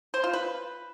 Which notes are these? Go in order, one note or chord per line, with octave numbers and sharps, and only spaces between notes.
C5
F4
B4